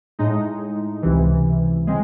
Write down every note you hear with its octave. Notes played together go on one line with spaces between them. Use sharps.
A2 G#3 D#4
C#2 C3 E3
C#3 G#3 C4